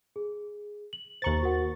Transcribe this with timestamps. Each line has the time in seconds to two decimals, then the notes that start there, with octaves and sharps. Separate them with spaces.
0.16 G#4
0.93 F#7
1.22 D#2 C5 A#5 C#6 A6 F#7
1.43 F#4 A#4 F#5